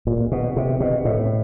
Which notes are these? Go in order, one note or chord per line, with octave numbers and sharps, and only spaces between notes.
A#2
B2
C3
B2
A2